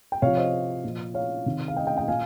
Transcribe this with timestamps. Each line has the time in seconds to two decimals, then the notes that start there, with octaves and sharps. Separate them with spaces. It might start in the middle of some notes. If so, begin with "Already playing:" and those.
0.12 G5
0.22 C3 F3 C#5 F5
0.37 C5 D#5
0.84 A#2 F3
1.14 C#5 F5
1.46 C3 D#3
1.68 F5
1.76 D#5 G5
1.87 D#5 G5
1.97 D#5 G5
2.08 A#2 F5 G#5